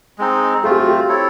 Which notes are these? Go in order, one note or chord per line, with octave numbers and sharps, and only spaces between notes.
G#3 C4 D#4
A3 C4 F4 G#4
G4
F#4
G4
C4 E4 A4 C#5